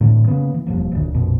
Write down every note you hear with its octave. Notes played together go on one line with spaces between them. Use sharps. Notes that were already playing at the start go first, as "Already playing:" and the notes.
A2 D3 E3
C#3 A#3 B3
E3
E1 G2 F3 A#3
D#1 D2
A#1 F2 B2